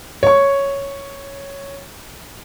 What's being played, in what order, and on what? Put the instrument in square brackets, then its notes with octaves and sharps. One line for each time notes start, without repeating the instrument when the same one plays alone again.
[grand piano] C#5 C#6